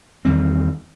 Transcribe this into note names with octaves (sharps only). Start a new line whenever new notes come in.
E2 D#3 G3 C4